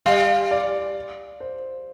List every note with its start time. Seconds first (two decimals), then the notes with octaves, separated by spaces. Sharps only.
0.06 G3 F5
0.51 D5
1.40 C5